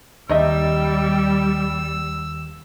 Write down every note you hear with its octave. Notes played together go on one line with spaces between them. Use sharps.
D#2 G3 D#4 D#5 E5 E6